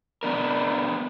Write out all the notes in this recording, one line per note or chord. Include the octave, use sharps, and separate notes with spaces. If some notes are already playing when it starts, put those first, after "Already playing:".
B3 D4 A#4